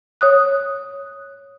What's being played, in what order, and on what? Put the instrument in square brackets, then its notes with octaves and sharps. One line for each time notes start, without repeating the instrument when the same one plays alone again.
[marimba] C#5 D#6 F#6